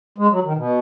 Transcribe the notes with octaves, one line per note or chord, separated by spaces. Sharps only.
G#3
F#3
D#3
B2